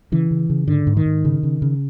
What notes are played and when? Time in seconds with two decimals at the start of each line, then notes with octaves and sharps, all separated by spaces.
0.12 C#3 E3
0.31 C#3
0.50 C#3
0.68 G#2 D3
0.87 G#2
0.97 D#3
1.06 G#2
1.25 C#3
1.43 C#3
1.62 C#3